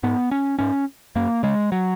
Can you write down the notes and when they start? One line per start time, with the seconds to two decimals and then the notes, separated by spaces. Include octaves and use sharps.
0.03 G#2 B3
0.31 C#4
0.59 G#2 C#4
1.15 F#2 A#3
1.43 C#3 G#3
1.72 F#3